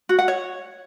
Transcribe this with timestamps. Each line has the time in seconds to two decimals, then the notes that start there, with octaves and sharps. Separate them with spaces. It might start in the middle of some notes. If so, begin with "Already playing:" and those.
0.09 F#4
0.19 F#5
0.28 C#5